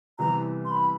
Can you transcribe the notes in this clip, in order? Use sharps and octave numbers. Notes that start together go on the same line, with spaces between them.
C2 C3 E3 G3 B3 A#5
C6
B5